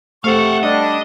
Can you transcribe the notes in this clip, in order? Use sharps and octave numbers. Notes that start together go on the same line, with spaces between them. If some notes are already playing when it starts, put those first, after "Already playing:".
C3 A3 A4 F5 F#5 C#6
G3 D4 D#5